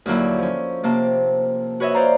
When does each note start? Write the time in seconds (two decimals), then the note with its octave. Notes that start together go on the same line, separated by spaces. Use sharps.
0.06 D#2 D3 F#3 A#3 E4
0.38 F3 C#4
0.83 C3 A#3 A5
1.80 F#4 B4 C#5 D#5 E5
1.94 C5 D5 F5 A#5